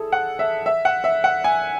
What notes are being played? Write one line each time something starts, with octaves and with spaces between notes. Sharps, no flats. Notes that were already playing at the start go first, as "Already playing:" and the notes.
Already playing: E4 G#4 A4
F#5
E5
E5
F#5
E5
F#5
G#5